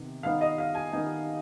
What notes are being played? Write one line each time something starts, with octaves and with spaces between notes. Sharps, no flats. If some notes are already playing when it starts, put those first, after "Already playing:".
Already playing: C3 D#3 B3
D#3 B3 D#4 F5
D#5
F5
G#5
D#3 B3 D#4 G#5